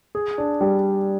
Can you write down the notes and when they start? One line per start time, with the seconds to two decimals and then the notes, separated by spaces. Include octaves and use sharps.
0.15 G#4
0.38 D4
0.61 G3